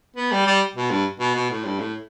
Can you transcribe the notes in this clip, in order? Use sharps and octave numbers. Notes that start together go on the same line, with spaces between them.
B3
G3
G3
B2
G2
B2
B2
A2
G2
A2